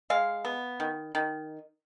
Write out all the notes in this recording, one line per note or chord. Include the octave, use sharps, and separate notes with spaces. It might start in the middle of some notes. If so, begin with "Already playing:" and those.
G#3 F5
B3
D#3
D#3